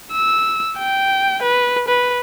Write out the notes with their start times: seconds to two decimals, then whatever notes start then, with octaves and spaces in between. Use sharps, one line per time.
0.12 E6
0.78 G5
1.43 B4
1.88 B4